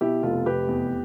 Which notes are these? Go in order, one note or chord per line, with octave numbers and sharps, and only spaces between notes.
B2 E4 G4
F1 F4 A4
F1 G4 B4
E2